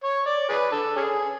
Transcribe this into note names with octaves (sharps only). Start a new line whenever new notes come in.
C#5
D5
G#4 B4
D4 A4
C#4 G#4